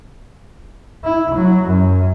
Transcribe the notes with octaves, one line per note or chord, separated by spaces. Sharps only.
E4
F#3
F#2